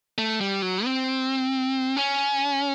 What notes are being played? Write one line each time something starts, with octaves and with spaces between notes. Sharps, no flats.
A3
G3
F#3
C4
C#4